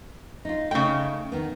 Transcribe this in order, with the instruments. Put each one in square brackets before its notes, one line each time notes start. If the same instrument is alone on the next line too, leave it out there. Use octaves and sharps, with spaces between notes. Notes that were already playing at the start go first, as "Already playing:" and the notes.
[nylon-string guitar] D#4 F4
[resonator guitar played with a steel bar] C#3 G5 [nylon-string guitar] A3 D#4
[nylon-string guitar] D#3 B3